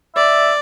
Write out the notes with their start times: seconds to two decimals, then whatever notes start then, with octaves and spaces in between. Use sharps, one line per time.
0.16 D5 E5